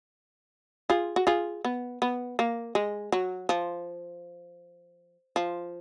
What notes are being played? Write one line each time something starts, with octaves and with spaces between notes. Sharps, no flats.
F4 G#4
F#4
F4 G#4
B3
B3
A#3
G#3
F#3
F3
F3